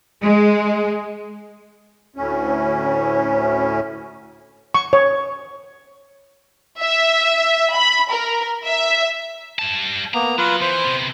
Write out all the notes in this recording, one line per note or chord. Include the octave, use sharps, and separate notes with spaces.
G#3
D2 A2 C#4
C#6
C#5
E5
B5
A#4
E5
G3 A5
A#3 B3 A#5
F#3 F4 B4
E3 C5
C3 B3